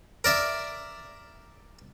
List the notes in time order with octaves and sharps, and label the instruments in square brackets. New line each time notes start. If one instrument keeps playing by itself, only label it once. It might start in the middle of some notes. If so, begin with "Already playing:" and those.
[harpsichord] A#4 D5 E5